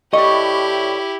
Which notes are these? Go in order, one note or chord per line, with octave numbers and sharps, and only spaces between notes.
A2 E4 G4 D5 D#5 C#6